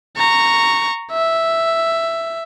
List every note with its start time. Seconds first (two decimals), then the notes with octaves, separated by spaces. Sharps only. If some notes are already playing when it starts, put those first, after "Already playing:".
0.17 A#5 C#6
1.12 E5